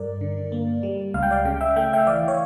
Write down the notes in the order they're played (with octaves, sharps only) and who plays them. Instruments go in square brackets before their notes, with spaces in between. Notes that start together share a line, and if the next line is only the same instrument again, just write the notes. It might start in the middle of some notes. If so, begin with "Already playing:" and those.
Already playing: [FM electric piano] G2 A#4 D5
D3
A#3
G3
C#2 F5
G5
D5 F5
C#3 G5
E5 G5
A3 G5
E5 G5
E3 D5 F5
C#5